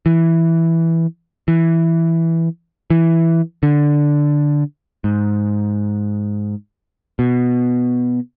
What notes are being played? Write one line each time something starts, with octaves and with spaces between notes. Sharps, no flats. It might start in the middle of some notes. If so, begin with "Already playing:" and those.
E3
E3
E3
D3
G#2
B2